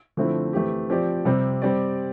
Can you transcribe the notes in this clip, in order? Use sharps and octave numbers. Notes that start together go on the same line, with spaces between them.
D3 F3 A3 C4 E4
E3 A3 C4 G4
F3 C4 G4 D5
C3 G3 C4
G3 C4 G4 D5